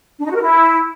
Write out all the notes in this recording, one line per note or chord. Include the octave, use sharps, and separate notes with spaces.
D4
D#4
F#4
A#4
E4